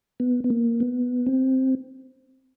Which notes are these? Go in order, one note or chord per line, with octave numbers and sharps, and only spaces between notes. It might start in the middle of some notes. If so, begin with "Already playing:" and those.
B3
B3
A#3
B3
C4